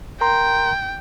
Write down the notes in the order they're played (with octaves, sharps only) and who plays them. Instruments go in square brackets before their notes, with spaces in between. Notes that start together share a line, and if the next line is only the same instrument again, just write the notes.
[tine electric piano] A#4 A#5 C6 [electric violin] G5